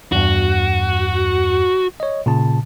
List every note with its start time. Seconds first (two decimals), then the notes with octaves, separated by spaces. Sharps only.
0.12 E2 G2 F#4
2.00 C#5 D#5
2.26 A#2 C#3 A5